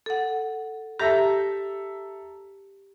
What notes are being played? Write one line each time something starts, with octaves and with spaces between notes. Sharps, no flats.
A4 F#5
G4 A4 E5 A#5